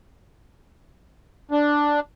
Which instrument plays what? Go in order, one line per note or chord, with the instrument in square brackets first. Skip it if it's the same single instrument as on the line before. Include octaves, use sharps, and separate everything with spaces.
[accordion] D4